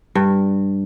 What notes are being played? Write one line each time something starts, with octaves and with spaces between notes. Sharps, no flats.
G2